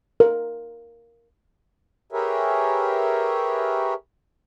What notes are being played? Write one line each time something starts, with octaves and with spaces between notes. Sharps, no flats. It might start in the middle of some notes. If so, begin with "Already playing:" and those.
A#4
G4 G#4 A#4 B4 C#5 E5